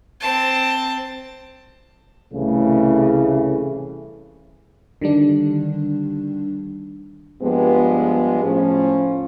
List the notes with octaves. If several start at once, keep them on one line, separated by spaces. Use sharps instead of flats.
C4 A5
C2 A2 C#3 E3 A3
D3 D#3 G3 D4
G2 F3 G3 G#3 B3
A2 F3 C#4